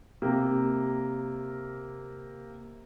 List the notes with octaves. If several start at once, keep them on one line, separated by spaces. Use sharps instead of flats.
C3 A#3